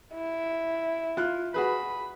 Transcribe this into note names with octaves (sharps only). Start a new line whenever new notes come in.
E4
F4 F#6
F#4 G#4 B4 B5